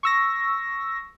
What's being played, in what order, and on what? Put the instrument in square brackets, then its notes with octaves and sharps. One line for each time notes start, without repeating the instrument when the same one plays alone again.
[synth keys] C#6 E6 A#6